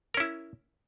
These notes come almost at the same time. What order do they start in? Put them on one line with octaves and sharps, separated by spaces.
A#4 C#4 E4